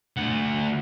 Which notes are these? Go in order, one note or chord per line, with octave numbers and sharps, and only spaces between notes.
D2 F#5